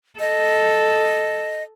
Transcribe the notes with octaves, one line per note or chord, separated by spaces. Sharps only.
A4 D#5